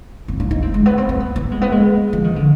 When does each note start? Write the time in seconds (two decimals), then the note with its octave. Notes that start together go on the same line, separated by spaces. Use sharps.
0.28 C4
0.40 D4
0.51 D#4
0.62 C4
0.74 G#3
0.86 B3
0.98 C4
1.09 C4
1.20 B3
1.36 B3
1.51 G#3
1.62 B3
1.72 G#3
2.13 F3
2.24 D#3
2.36 D3